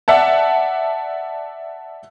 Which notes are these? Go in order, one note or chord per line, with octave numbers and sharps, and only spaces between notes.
D5 E5 F#5 A5